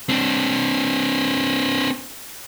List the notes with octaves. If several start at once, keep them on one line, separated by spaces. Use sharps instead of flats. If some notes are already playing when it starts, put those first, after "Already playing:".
C4 D4